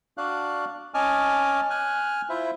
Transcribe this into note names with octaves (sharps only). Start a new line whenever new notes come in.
D4 F#4 D5 F5 F#6
C#4 D#5 G#5 A5 D6 F6
G#5 F6 F#6
E4 F4 C5 E5